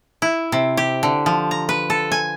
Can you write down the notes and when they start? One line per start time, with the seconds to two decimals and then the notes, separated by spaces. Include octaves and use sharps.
0.22 E4
0.52 C3
0.77 G4
1.03 D3
1.26 F3
1.51 A#5
1.69 B4
1.90 A4
2.12 G#5